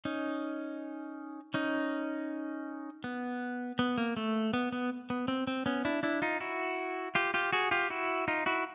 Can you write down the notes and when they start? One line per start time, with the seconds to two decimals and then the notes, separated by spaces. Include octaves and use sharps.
0.05 C#4 D#4
1.54 C#4 D#4
3.04 B3
3.79 B3
3.98 A#3
4.17 A3
4.53 B3
4.73 B3
5.10 B3
5.28 C4
5.47 C4
5.66 B3 C#4
5.85 D4 E4
6.03 D4 E4
6.22 D#4 F4
6.40 E4 F#4
7.15 F4 G4
7.34 F4 G4
7.53 F#4 G#4
7.71 F4 G4
7.90 E4 F#4
8.28 D#4 F4
8.46 E4 F#4